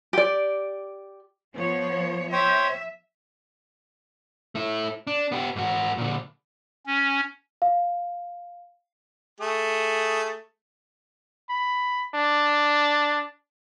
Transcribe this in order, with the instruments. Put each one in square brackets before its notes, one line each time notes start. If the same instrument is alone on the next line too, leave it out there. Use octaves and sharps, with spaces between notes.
[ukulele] G4 D5
[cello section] F3 B3 C#5
[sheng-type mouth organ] C5 C#5 G5 [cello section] E5
[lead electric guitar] A3 E4
D4
B3 G4
G#2 F#4
A#2 D3
[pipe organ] C#4
[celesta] F5
[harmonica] A3 G#4
[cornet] B5
D4